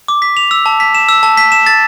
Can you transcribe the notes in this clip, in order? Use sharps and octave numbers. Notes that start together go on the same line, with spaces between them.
D6
B6
F7
E6
A5
B6
E7
E6
A5
B6
E7
A6